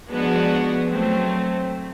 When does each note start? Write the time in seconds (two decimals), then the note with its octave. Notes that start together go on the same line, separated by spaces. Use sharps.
0.10 F3 G#3 B3 D4 F#4
0.90 F#3 A3 C4